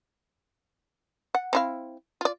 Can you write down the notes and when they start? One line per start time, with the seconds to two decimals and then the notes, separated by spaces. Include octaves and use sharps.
1.35 F#5
1.53 C4 E4 F5
2.21 F4 D5